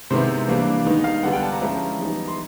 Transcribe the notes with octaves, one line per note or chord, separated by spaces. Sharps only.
C3 D#3 G#3 B3 E4 C5
E3 G3 A#3 D4
D#3 G#3 B3 D#4
F5
D3 G3 B3 D4 F4 F#5
G5
A5
A#5
F3 G#3 C#4 E4
E3 G3 B3 D#4
C6